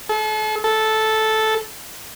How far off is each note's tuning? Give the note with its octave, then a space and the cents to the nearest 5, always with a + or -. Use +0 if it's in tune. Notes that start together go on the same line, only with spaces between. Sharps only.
A4 -40
A4 -10